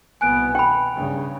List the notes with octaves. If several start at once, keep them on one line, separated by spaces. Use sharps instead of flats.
C2 B2 B3 G#5 F#6 D7
G5 B5
G2 C#3